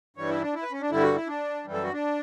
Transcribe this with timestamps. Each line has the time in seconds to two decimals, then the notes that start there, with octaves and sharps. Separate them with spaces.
0.17 G2 E3 G3 C#5
0.29 E4
0.41 D4
0.54 E4
0.63 B4
0.72 C#4
0.81 D4
0.91 G2 D3 G3 E4
1.03 F#4
1.15 E4
1.27 D4
1.64 F#2 E3 G3
1.73 A4
1.83 F#4
1.93 D4